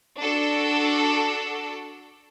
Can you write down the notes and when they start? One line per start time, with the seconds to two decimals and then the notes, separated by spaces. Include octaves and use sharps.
0.20 D4 F#4 A4